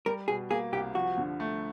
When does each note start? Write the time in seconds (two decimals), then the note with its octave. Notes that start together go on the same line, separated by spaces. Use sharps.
0.06 G3 A#4
0.28 B2 G#4
0.50 A#3 G#4
0.72 C2 G4
0.95 F3 F#4
1.18 D3
1.40 A3